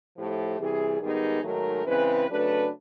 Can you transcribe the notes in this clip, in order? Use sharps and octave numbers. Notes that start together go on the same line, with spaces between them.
A2 F3 A3 G4
C3 E3 G3 G#4
G#2 D#3 G3 B3 D#4 G#4
G#2 D#3 F#3 A3 A#4
C#3 E3 G#3 C4 B4
C#3 F#3 A3 D4 B4